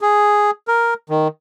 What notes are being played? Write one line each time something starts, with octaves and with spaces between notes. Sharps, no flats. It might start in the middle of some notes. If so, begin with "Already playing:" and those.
G#4
A#4
D#3